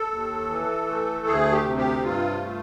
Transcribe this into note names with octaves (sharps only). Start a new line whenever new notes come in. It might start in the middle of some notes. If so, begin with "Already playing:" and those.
Already playing: A4
D#2
E3
A3
D2 G#4
G4
C3
G4
G2 F4
A3